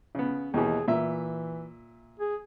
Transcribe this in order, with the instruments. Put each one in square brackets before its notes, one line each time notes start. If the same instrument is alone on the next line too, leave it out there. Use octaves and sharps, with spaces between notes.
[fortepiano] C#3 B3
[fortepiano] D#2 B2 E3 [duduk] G#4
[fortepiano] A#2 E5 [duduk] E3
[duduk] G#4